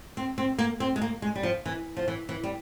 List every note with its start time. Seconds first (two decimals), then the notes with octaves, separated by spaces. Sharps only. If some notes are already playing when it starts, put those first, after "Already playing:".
0.17 C4
0.38 C4
0.58 A#3
0.80 C4
0.96 G#3
1.02 A#3
1.22 G#3
1.36 G3
1.43 F3
1.66 E3
1.97 F3
2.08 E3
2.29 E3
2.44 G3